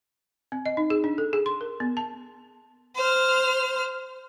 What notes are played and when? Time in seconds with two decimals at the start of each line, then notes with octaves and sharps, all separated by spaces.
0.52 C4
0.66 D#5
0.77 D#4
0.90 G#4
1.04 D4
1.18 A4
1.33 G#4
1.46 C6
1.61 A#4
1.80 B3
1.97 A5
2.96 C5 F6